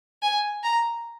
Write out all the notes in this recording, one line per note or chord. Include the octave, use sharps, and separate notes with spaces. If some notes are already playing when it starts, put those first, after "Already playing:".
G#5
A#5